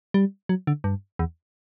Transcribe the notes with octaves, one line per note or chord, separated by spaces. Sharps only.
G3
F#3
D3
G2
E2